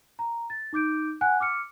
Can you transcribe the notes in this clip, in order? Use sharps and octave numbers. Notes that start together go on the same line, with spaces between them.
A#5
A6
D#4 D6 G6 D7
F#5 G#5 F#6
D6 F6 C#7